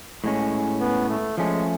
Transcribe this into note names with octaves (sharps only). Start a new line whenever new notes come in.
A2 G#3 C#4
B3
A3
F3 G#3 A3 C#4